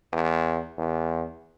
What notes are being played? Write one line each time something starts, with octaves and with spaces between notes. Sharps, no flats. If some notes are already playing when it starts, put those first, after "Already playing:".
E2
E2